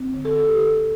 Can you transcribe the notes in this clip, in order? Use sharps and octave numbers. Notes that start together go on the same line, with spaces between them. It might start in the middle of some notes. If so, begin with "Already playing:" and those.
Already playing: C4
D3
A4
D3 A4
G4
D4 A4